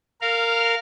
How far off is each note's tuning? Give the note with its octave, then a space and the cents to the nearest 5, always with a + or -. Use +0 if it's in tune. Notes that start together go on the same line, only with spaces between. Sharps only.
A#4 -15 F5 +0